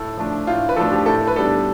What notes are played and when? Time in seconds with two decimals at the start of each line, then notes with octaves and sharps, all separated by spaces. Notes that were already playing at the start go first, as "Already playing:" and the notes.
Already playing: A2 A4
0.17 F3 A3 D4
0.47 A2 F4
0.69 B4
0.77 F3 A3 D4 A4
0.92 G4
1.06 A2 A4
1.28 B4
1.36 G3 B3 D4 A4